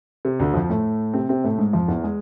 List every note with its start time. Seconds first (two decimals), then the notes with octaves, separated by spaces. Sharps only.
0.25 C3
0.40 D2 D3
0.54 F2 F3
0.70 A2 A3
1.14 C3 C4
1.29 C3 C4
1.44 A2 A3
1.58 G#2 G#3
1.73 F2 F3
1.88 E2 E3
2.04 G#3